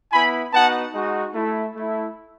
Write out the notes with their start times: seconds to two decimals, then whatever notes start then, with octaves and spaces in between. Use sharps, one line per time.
0.12 B3 E4 G#5 B5
0.53 B3 D#4 F#4 F#5 A5
0.94 G#3 D#4 F#4
1.35 A3 E4
1.76 A3 E4